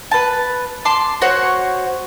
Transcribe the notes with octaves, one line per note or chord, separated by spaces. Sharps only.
B4 A5
A5 C6 D6
F#4 C5 C#5 F#5